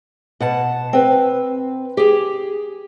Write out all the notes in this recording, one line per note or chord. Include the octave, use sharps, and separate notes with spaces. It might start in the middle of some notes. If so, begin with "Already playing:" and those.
B2 F#5 A5
C4 B4
G4 G#4